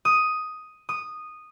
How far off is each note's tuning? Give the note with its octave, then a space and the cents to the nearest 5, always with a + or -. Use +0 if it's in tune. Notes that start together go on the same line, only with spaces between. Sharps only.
D#6 +5
D#6 -10